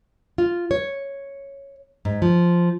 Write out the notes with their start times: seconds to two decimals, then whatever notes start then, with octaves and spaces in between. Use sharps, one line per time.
0.38 F4
0.71 C#5
2.05 G#2
2.22 F3